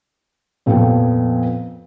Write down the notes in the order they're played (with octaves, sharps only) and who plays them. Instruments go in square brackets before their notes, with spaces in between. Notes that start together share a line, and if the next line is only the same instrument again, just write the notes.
[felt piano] F2 A#2 F3 B3 A4 G5